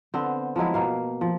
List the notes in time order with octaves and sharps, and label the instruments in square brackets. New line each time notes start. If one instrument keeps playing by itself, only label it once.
[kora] D3 B3 C4
F3 F#3 G#3 E4
B2 A#3 F5
F3